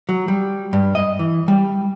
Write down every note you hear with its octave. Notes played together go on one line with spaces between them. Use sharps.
F#3
G3
G2
D#5
E3
G3